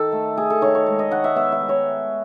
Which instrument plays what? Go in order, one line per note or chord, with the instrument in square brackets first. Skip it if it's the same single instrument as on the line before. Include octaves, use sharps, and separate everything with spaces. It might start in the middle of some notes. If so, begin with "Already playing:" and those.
Already playing: [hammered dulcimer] D#3 A4
A3
A3 G#4
A4
D#3 C#5
C#5
G#3
D#5
D#3 F#5
E5
B3 E5
E5
G#3
C#5